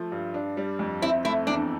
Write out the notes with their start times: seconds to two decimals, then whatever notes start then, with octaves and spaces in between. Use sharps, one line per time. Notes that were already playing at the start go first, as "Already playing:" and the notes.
Already playing: F3 A3
0.12 G2
0.34 D4
0.57 G3
0.79 F2
1.02 C4 E4
1.25 A3 E4
1.47 E2 D4